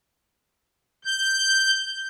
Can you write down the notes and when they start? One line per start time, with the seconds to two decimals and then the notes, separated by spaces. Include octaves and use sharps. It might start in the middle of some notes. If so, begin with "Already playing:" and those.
1.05 G6